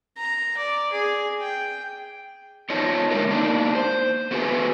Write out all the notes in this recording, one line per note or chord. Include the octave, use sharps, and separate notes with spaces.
A#5
D5
G#4
G5
B3 D#4 F4 C#5 D#5 A5
D3 G#3 A3 G4 A#4
A#3 D4 D#4
C5
A3 B3 F#4 G#4 B4 G#5